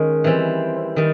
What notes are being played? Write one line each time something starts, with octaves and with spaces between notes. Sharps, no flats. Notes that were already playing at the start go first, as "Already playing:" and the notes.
Already playing: D#3 G#3 C#4
E3 G3 C4
D#3 G3